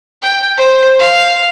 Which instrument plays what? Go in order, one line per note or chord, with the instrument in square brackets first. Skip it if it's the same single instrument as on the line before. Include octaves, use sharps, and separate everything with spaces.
[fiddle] G5
C5
F5